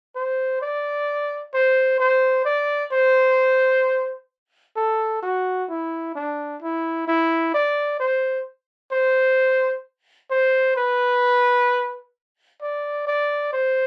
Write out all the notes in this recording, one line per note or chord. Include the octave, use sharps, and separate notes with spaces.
C5
D5
C5
C5
D5
C5
A4
F#4
E4
D4
E4
E4
D5
C5
C5
C5
B4
D5
D5
C5